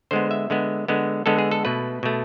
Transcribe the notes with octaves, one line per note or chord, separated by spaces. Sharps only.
D3 G#3 B3 C5
E5
D3 G#3 B3
D3 G#3 B3
D3 G#3 B3 A4
G#4
A4
B2 A3 B4
B2 A3